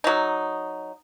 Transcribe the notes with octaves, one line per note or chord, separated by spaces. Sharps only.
F#3 D#4